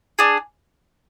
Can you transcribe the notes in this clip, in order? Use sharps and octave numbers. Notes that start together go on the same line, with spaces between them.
D4 G#4